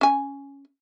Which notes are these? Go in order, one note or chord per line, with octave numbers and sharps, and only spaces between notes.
C#4 G#5